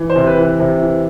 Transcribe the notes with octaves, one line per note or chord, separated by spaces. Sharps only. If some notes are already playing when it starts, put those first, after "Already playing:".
Already playing: E3
C5
C3
B4
E3
C3
E3